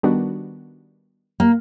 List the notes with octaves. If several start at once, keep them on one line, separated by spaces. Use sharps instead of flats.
D#3 G3 B3 D4 F#4
A#3